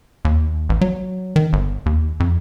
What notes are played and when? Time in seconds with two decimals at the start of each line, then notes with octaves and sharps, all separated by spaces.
0.25 D#2
0.69 A1
0.81 F#3
1.36 D#3
1.53 G1
1.86 D#2
2.20 F2